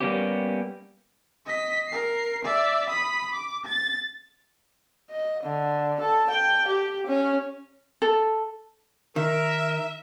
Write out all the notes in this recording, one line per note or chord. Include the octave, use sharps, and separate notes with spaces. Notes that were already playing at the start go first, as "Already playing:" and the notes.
G3 A#3 B3 C#4 G4
D#5 B6
A#4 C7
D5 E5
B5 D#6
D6
A6
D#5
D3
A4
G5
G4
C#4
A4
D#3 A#4 E5